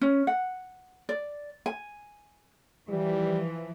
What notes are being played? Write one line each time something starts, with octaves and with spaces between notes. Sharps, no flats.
C#4
F#5
D5
G#5
E3 F3 G3